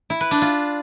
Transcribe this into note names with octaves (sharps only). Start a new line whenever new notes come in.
E4
B4
D4
F4